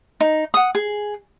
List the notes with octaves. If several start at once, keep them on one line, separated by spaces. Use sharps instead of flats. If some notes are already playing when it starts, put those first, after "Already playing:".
D#4
F#5 D#6
G#4